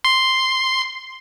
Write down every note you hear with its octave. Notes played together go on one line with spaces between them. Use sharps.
C6